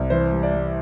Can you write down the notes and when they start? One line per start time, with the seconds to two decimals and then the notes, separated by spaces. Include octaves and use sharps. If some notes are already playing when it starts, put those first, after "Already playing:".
Already playing: C2
0.10 E3 C5
0.32 G3
0.43 D5
0.53 G3